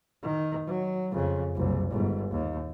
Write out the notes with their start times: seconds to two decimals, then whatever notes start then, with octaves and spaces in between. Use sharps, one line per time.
0.23 D#3
0.67 F#3
1.12 F2 C#3
1.56 F#1 C2
1.91 G1 G#2
2.31 D#2